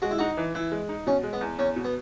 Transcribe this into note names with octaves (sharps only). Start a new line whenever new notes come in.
G#3 F#4
E4
D#4 F#4
E3
E3 E4
G#3
D#4
B2 C#4
G#3
B3
E2
E2 C#4
B2
B3